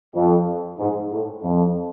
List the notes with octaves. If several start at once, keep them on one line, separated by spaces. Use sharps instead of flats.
F2
G#2
A2
F2